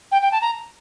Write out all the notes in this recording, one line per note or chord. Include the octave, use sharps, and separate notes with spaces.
G5
G5
A5
A#5